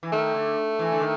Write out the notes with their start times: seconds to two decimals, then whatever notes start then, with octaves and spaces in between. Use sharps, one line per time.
0.03 E3
0.12 D#3 A3
0.35 D3
0.79 E3
0.92 D3
1.02 D#3